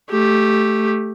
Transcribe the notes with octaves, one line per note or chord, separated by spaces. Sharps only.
A3 G4